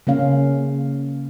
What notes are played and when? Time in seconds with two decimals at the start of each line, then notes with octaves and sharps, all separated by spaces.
0.07 C#3 A#3 C#4 F5